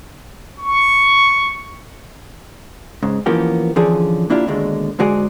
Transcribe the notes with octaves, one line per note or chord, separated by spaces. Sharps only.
C#6
G#2 C#3
E3 F3 A#3 B3 C#4 G4
D3 E3 F3 C#4 G#4 D5
A#3 D4 E4 F4 G4
D#2 B2 D3 G#3
G#2 D3 G#3 F#4 G#4 D5